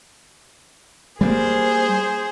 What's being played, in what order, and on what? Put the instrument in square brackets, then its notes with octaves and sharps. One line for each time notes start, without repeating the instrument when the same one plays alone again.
[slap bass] G3 G#3 A#3 [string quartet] G#4 C5